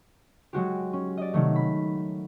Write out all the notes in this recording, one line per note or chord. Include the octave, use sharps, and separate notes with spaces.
F#3 G#3 F#4 G4
C#4
D5 D#5
C3 D#3 F#3 A3
B5